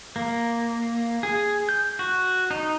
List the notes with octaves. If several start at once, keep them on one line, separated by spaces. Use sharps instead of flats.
A#3
G#4
G6
F#4
D#4